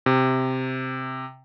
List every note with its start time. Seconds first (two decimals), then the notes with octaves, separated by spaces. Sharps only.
0.06 C3